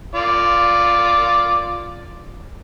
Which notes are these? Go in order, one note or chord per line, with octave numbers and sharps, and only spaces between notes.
F4 D5